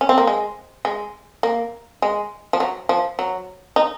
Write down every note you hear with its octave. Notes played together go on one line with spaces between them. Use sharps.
C#4
C4
A#3
G#3
G#3
A#3
G#3
F3
F#3
F3
F#3
D#4